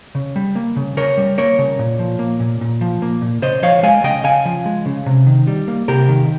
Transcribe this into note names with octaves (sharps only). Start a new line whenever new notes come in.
C#3
G3
A#3
C#3
C#3 A#4 C#5
G3
A#3 A#4 C#5
C#3
A#2
F3
A#3
A#2
A#2
F3
A#3
A#2
C#3 C5 D#5
F3 C#5 F5
G#3 F5 G#5
C#3 D#5 G5
C#3 F5 G#5
F3
G#3
C#3
C3
D#3
G3
A#3
C3 G4 A#4
D#3